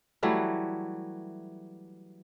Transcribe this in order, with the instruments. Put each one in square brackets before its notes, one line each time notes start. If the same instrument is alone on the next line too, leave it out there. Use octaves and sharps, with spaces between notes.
[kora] E3 F#3 G3 A3